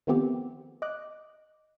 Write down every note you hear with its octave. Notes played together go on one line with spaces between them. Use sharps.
D#3 F3 A3 B3 C4 G4
D#5 D6 F#6